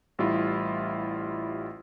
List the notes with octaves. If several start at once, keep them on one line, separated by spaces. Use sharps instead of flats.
A1 G3 E4 F4